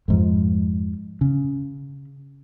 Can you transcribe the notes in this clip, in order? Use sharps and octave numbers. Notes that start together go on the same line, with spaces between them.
F2 G#2 F3
C#3